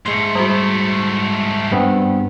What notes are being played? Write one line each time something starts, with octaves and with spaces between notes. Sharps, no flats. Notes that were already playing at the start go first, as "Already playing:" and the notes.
G#2 G#3 A3 C6
G3 F#4
G2 B3 C4